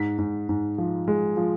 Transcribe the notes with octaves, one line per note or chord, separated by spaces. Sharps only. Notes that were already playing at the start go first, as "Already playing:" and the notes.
Already playing: G#2 B6
G#2
G#2
F3
G#3
F3